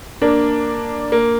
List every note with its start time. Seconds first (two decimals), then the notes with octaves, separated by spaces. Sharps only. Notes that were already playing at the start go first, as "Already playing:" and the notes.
0.22 A#3 D4
1.12 A#3